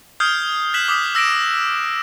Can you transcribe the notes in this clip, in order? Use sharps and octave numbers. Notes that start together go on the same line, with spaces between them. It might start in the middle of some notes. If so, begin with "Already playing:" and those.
D#6 F6 G6 G#6 C7
F#6 G#6 B6 E7 F#7
D6 D#6 B6
E6 A#6 B6 D7 E7